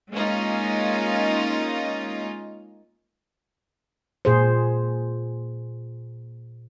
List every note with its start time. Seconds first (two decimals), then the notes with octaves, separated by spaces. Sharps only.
0.12 G#3 A#3 C#4 D#4 F4
4.25 A#2 G#4 C5